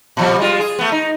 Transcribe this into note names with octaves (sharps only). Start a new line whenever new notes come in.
A#2 F3 G3
G3 G#3 F4
G#4
A3 B3
D#4